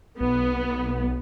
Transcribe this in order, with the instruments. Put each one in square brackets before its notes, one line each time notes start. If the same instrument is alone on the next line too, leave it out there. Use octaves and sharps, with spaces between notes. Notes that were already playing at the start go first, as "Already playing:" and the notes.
[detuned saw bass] B1 [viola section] B3